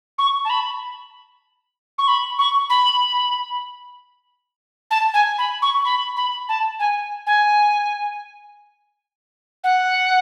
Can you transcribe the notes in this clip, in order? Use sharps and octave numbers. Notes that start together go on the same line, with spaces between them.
C#6
A5
B5
C#6
B5
C#6
B5
A5
G#5
B5
C#6
B5
B5
A5
G#5
G#5
F#5